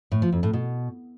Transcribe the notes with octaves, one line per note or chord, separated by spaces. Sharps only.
A2
F3
F2
A2
B2